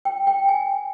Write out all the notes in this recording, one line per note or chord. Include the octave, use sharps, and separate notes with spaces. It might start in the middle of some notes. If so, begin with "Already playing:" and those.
G5
G5
G#5